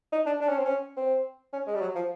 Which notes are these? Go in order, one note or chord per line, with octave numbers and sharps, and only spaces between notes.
D#4
D4
D4
C#4
C4
C#4
C4
C#4
G#3
G3
F#3
F3